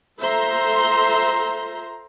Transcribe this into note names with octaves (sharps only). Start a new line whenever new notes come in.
F4 A4 C5 E5 A#5 C6